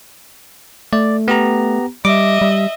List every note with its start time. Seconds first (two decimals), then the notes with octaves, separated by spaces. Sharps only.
0.93 A3 D5
1.28 B3 G4 A#5
2.05 G3 D#5 E5 D6
2.41 G3